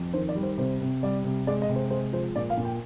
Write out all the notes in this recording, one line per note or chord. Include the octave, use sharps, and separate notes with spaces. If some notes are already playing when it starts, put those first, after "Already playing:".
Already playing: F2
D#3 C5
D5
G3
C5
C3 C5
C3
G3 D5
C3
G#3 D5
D#5
C3
C5
G#3 C5
F3 C5
A#2 D5
F5
A#2
G5